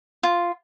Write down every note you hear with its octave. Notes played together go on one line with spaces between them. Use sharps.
F4